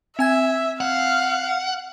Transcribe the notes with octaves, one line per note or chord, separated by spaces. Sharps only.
C4 E5 G#5 G#6
F5 F#5